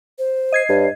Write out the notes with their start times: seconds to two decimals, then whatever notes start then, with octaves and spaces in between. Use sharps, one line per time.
0.19 C5
0.52 D#5 G#6 C7
0.69 G2 C#5